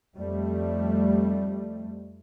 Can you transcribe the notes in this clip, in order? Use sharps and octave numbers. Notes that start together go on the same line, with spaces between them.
F2 G3 A3